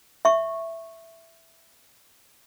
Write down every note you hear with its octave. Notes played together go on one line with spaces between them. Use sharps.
E5 C#6